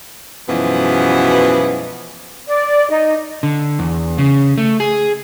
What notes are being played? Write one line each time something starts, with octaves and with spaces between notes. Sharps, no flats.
F#2 B2 E3 F3 G#3 B3
D5
D#4
D3
E2
C#3
A3
G#4